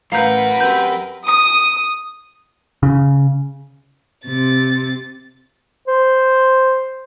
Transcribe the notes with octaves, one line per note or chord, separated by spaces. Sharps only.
A1 F#2 A#4 B4 F5 F#5 A#5 G6
F#3 C4 G4 G6
D#6
C#3
C3 A6
C5